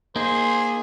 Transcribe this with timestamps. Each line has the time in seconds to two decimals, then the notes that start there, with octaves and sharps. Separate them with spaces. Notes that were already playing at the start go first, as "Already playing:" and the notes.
0.16 A#3 D#4 G#4 C5